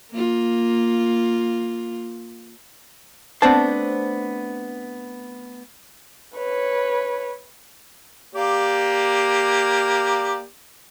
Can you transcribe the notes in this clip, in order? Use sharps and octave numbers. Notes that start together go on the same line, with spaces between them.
A#3 F4
A3 B3 C4 D4 C5 A5
B4 C#5
A#3 G4 D5